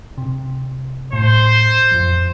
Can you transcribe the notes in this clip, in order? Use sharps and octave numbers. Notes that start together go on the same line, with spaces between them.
C3
A2 C5
F2 F3